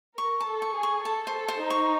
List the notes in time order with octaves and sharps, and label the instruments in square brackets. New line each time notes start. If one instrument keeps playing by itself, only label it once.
[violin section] A#4 [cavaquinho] C#6
[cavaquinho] A5
[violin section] A4
[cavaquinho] C#6
[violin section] G#4
[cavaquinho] C#6
[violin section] A4 [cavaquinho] A5
[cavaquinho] C5
[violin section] A4
[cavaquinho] C5
[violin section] D#4
[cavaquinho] C#6